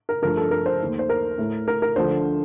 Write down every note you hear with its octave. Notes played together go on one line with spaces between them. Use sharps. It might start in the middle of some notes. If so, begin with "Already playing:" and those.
A#4
G2 F3 A3 A#4
A4
A#4
C5
D#2 D#3 A3
C5
A#4
A2 A3
A#4
A#4
D2 D3 F3 A3 C5